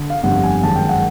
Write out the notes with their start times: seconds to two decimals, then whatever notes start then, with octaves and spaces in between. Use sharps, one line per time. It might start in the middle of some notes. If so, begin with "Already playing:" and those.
Already playing: D3
0.10 F5
0.24 G1 F2 D3 G3 F#5
0.44 G#5
0.63 F#2 D#3 G#3 A5
0.76 G5
0.89 F#5